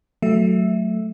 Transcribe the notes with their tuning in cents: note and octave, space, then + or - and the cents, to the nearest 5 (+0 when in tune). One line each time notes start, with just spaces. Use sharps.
F#3 +0 A3 +0 E5 +0